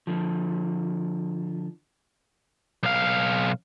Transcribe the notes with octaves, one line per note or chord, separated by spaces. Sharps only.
D3 F3
B1 F5